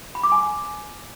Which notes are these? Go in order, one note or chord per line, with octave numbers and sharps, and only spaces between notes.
B5
D6
G#5